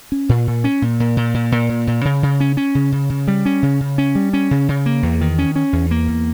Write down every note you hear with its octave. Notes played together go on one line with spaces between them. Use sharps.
C#4
A#2
A#2
C#4
A#2
A#2
A#2
A#2
A#2
A#2
A#2
C#3
C#3
C#4
C#4
C#3
C#3
C#3
G3
C#4
C#3
C#3
C#4
G3
C#4
C#3
C#3
A#3
E2
D#3
C#4
C#4
E2
A#3
E2